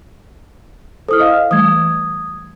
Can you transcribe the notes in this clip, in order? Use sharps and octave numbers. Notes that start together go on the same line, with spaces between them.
E4 A4 C5 D#6 F6
D#5 F5
E3 G3 A3 D#6 G#6